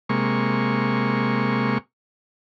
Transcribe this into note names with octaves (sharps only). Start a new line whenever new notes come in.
C3 G#3 A#3 C#6